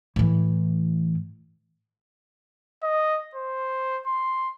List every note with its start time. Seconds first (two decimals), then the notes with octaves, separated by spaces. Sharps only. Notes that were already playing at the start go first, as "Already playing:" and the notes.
0.16 A2 E3
2.83 D#5
3.35 C5
4.07 C6